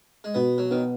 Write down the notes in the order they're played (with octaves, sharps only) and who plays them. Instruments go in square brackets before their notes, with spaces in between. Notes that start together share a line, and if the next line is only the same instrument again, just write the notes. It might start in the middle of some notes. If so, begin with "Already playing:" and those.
[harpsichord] G#3
[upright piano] B2 [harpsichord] B3
[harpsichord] F#3
[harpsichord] D#3 [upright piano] B3